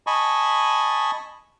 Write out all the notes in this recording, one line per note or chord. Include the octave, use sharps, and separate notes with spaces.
D#5 G#5 A5 B5 C#6